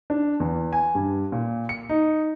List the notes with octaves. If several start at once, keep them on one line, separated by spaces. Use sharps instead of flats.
D4
E2
G#5
G2
A#2
C#7
D#4